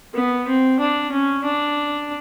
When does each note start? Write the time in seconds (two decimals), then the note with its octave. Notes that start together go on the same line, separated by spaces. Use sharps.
0.14 B3
0.47 C4
0.79 D4
1.11 C#4
1.44 D4